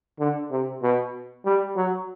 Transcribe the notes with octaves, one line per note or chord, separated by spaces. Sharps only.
D3
C3
B2
G3
F#3